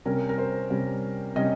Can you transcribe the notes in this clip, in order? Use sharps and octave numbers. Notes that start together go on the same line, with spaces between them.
C3 G3 C#4 A#4
A#4
C5
C3 G3 C#4
C3 G3 C#4 D#5